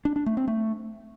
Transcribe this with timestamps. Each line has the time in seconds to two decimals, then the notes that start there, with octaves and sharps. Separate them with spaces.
0.05 D4
0.16 D4
0.26 A3
0.37 C4
0.48 A3